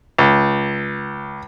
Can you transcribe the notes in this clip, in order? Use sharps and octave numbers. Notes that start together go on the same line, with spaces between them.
C#2